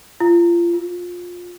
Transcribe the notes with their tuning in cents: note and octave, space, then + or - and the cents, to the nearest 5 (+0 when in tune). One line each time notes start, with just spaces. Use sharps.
F4 -30
F4 +20